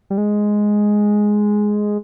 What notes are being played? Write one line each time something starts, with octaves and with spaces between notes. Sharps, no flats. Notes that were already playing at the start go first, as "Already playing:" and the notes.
G3
G#3